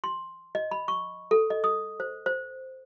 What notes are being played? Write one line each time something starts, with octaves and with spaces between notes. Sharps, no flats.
C6
D#5
B5
C#6
A4
D#5
D#6
C5
C5